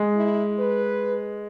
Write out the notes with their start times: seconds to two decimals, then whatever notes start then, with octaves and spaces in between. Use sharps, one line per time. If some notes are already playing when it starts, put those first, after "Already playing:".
Already playing: G#3
0.16 E4
0.58 B4